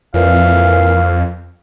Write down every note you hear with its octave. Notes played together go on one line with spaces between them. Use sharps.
F2 A#2 E3 F5